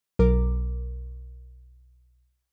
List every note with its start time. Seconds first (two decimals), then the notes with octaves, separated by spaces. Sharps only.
0.19 B1 A#4 D6